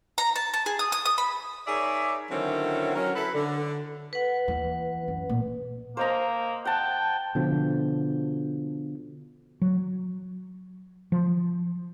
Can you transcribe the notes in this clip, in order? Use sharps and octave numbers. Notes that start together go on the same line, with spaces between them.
A#5
A5
A5
G#4
D#6
D#6
D#6
B5
D#4 G#4 A#4 C#5 D5 E5
D3 D#3 F#3 C4 C#4 E4
F#3 C#4 A#4
E4 A4 B4
D3
B4 F#5
D#2 E3
F#2
A#2
A#3 C5 D#5 A#5
F#5 G5 A5
B2 D3 F3
F#3
F3